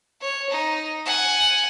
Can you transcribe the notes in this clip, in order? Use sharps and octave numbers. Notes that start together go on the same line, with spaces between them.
C#5
D#4
F#5 G#5